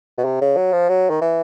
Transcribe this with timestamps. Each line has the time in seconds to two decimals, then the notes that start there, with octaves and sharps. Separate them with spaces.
0.18 B2
0.25 C3
0.41 C#3
0.56 F#3
0.73 F3
0.89 F#3
1.10 D#3
1.22 E3